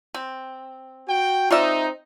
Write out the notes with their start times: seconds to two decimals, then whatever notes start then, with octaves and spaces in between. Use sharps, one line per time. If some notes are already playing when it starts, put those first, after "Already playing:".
0.14 C4
1.07 F#4 G5
1.50 C4 D#4 F4 D5 E5